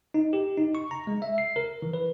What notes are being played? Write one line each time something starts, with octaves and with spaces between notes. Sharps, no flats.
D#4
G4
D#4
C#6
A#5
G#3
E5
C7
A#4
E3
B4